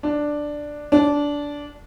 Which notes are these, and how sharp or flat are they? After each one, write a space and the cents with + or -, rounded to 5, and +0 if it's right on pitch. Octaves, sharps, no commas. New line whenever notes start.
D4 +5
D4 -15